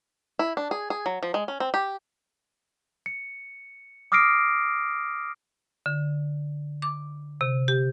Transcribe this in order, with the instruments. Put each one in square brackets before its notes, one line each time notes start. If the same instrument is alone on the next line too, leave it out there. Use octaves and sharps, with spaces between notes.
[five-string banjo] E4
D4
G#4
G#4
F#3
F3
G#3
C#4
C4
G4
[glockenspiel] C#7
D6 D#6 F6 A#6 C7 D7
[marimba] D3
D6
C3
G4